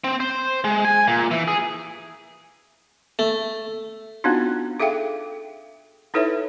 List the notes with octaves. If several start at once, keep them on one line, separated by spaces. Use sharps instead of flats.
C4
C5
G#3
G#5
A#2
E3
G#4
A3
B3 C4 D4 D#4 F4 F#4
G#4 A4 E5 F5 G5
D#4 E4 A4 B4 C#5 E5